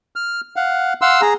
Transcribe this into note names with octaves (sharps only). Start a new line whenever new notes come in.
F6
F5 F#5
F5 F#5 C6 E6
G#4 A#5